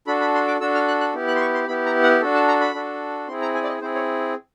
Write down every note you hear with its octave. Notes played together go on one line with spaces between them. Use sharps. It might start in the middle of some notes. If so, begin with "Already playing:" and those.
D4 F#4 A4 B5
B5
C6
D6
D4 F#4 A4 E6
F6
F#6
F#6
B3 E4 G4
F#6
C6
C#6
C6
B3 E4 G4 B5
A#5
F#5
D4 F#4 A4
A5
A#5
B5
D4 F#4 A4
C4 E4 G#4 C6
A#5
G#5
D5
D#5
C4 E4 G#4 C5
C#5